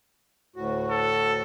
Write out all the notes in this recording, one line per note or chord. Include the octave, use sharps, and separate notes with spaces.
D2 A2 F#4
A4